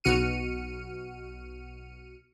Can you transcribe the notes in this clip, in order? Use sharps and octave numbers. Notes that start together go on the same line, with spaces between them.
B1 B2 F#4 F6 C#7 D#7